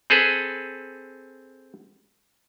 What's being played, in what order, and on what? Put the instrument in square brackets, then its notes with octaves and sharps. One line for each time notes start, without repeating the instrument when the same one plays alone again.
[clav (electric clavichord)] C4 G#4 A4 B4